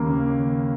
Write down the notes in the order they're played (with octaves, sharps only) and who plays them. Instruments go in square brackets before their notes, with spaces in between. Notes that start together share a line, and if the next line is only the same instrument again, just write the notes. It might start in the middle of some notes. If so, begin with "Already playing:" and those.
Already playing: [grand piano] D#2 C#3 A#3